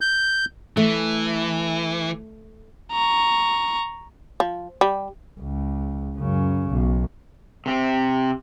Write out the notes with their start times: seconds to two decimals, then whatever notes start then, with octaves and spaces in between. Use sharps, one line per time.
0.01 G6
0.77 E3 A3
2.92 A#5 C#6
4.40 F3
4.81 G3
5.40 C#2
6.18 F#2 C#3
6.69 B1
7.66 C3 C4